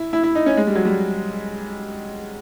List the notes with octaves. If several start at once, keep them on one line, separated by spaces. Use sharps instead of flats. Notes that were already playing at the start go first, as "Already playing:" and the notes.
Already playing: E4
E4
E4
D#4
C#4
G#3
G3
F#3
G3